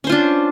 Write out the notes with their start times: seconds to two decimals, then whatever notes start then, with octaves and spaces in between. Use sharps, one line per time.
0.04 C#4
0.07 C5
0.09 F4
0.12 D4